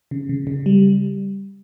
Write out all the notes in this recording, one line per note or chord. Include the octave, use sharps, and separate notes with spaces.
C#3
C#3
C#3
G3